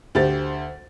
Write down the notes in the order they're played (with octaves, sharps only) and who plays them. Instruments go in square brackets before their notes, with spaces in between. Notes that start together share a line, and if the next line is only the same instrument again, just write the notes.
[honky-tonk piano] D2 G4 C5 A6